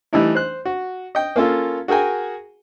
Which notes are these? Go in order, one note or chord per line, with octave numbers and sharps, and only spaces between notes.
E3 G3 A3 D#4 E4
C5 F#6
F#4
D#5 G5
A#3 C#4 F4 A4
F#4 G#4 A#4 G5 G#5